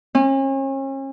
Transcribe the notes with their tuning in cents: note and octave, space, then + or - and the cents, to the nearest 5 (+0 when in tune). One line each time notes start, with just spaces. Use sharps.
C#4 -40